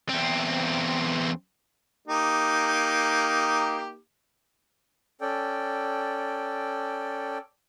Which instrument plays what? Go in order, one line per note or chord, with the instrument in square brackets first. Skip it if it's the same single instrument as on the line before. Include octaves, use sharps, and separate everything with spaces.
[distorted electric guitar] E2 C4
[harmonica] A#3 D#4 G4
[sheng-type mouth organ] C#4 A4 D5 G5